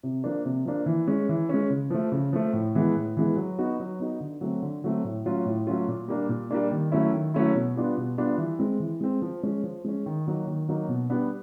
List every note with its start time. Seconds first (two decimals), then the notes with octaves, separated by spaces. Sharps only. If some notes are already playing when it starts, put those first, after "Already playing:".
0.03 C3
0.24 F3 A#3 D4
0.45 C3
0.66 F3 A#3 D4
0.86 E3
1.07 G#3 C#4
1.29 E3
1.49 G#3 C#4
1.70 C#3
1.90 F3 A3
2.12 C#3
2.33 F3 A3
2.53 A2
2.75 E3 G#3 B3
2.95 A2
3.17 E3 G#3 B3
3.37 F#3
3.58 B3 D#4 F#4
3.80 F#3
4.00 B3 D#4 F#4
4.20 D3
4.41 F#3 A3 C4
4.62 D3
4.84 F#3 A3 C4
5.04 A2
5.26 F#3 A3 C#4 F4
5.45 A2
5.67 F#3 A3 C#4 F4
5.88 A#2
6.08 G3 A#3 D4
6.29 A#2
6.51 G3 A#3 D4
6.71 D#3
6.92 F#3 A3 C#4 E4
7.13 D#3
7.34 F#3 A3 C#4 E4
7.55 B2
7.76 G3 B3 D4 F4
7.97 B2
8.18 G3 B3 D4 F4
8.38 E3
8.59 G#3 C4
8.80 E3
9.01 G#3 C4
9.22 F3
9.43 G#3 C#4
9.63 F3
9.85 G#3 C#4
10.06 D#3
10.27 F#3 A#3 D#4
10.47 D#3
10.69 F#3 A#3 D#4
10.88 B2
11.10 G3 B3 D4